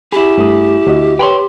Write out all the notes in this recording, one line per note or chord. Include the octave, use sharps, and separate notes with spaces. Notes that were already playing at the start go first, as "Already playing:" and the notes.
E4 G4 G#4 B5
G2 A3 D#6
D2 F#4 D#5
B4 C#5 G5 B5 C6